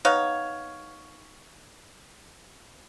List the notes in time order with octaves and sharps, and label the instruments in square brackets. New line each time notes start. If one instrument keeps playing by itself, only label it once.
[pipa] B3 D#4 C#5 F5